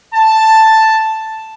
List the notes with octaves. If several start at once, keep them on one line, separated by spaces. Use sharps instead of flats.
A5